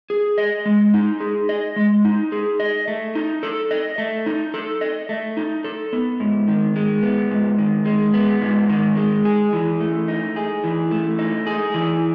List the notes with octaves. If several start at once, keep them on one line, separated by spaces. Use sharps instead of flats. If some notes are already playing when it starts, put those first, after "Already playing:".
G#4
D#5
G#3
D#4
G#4
D#5
G#3
D#4
G#4
D#5
A3
D#4
A4
D#5
A3
D#4
A4
D#5
A3
D#4
A4
B3
G#2
D#3
G#3
B3
G#2
D#3
G#3
B3
G#2
D#3
G#3
G#4
E3
A3
D#4
G#4
E3
A3
D#4
G#4
E3